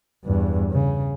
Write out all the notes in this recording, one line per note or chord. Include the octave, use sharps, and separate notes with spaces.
E2 G2
C#3